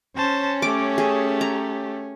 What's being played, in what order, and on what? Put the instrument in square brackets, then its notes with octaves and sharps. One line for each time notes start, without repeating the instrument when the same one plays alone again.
[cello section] C#4 [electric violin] C5 A5
[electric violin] A3 G4 [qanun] D6
[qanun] G#4
A#5